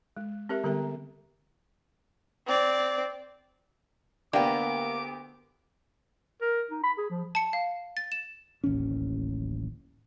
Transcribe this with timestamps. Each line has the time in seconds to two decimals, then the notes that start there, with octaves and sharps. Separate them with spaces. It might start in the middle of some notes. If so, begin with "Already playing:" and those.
0.17 G#3
0.49 C4 G4 A#4 E5
0.64 D3 G3 B3 G4 A#4 A#5
2.47 C4 D5
4.33 D2 A#3 B3 D4 G4 G5 D6
6.42 A#4
6.71 D#4
6.84 B5
6.98 G#4
7.10 F3
7.35 A5 C#7
7.53 F5
7.97 A6
8.12 E7
8.64 D1 A1 D#2 C#4